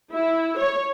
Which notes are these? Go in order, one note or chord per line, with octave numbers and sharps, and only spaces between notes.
E4
C#5